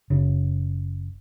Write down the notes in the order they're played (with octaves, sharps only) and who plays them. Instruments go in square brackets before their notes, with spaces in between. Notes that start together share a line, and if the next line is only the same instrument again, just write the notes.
[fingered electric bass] F#1 C#3